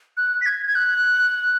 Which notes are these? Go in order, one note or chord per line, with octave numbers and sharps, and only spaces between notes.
F#6
B6
G#6
G#6
F#6